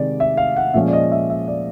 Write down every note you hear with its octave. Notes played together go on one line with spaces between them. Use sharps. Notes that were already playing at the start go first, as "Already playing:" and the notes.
Already playing: C3 D#3 G#3 D5
E5
F5
F#5
A#2 F3 G#3 C#4 E5
D5
D#5
E5
E5
D5